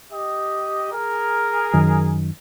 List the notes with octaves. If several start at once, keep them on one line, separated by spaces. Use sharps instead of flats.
G4 D#5
G#4 A#4
F#2 D#3